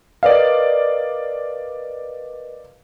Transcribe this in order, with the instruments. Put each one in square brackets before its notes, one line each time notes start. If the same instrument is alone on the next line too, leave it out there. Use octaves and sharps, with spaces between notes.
[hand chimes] A#4 B4 D#5 [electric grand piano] D5 F5